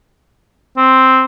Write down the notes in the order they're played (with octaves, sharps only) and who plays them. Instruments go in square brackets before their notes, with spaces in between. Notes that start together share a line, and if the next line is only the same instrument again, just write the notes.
[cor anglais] C4